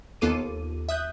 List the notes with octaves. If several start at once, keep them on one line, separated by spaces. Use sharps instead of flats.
D#2 B3 F4 A4 D6 D#7
E5 D#6 F#6 G6